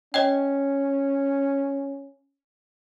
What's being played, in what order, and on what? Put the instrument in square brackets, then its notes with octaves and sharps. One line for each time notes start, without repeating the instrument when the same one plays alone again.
[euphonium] C#4 [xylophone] C#5 D#5 G5